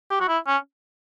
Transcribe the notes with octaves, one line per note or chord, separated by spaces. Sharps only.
G4
F#4
E4
C#4